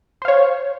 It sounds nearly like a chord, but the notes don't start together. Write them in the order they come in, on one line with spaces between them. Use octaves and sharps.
C5 F5 C#5